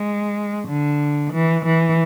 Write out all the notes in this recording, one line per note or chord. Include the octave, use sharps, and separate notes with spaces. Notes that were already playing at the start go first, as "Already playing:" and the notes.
Already playing: G#3
D3
E3
E3